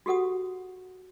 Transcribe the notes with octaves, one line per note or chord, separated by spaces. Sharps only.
F#4 G4 A4 F#5 D#6